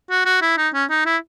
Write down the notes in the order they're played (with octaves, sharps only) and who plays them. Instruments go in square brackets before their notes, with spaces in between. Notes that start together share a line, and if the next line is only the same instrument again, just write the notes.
[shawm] F#4
F#4
E4
D#4
C#4
D#4
E4